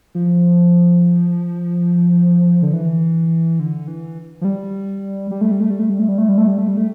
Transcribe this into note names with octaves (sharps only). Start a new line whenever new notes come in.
F3
D3
E3
D3
E3
F3
G3
G3
A3
G3
A3
G3
A3
G3
A3
G3
A3
G3
A3
G3
A3
G3
A3